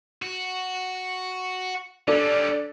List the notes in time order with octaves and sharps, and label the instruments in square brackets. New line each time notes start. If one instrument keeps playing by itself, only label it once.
[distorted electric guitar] F#4
[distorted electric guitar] G3 C#4 [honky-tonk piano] D4 A4